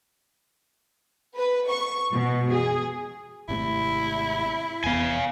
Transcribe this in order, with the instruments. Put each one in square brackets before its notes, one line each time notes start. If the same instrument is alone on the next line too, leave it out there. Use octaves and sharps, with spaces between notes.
[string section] B4
C#6
B2
G#4
[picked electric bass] G#1 C3 A3 [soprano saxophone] E4
[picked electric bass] F1 E2 B3 [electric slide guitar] F5 G#5